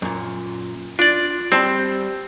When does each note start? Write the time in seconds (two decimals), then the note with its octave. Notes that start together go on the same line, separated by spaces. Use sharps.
0.02 F#2 A#2
0.99 D4 F4 D5
1.52 G3 C4 A5 C6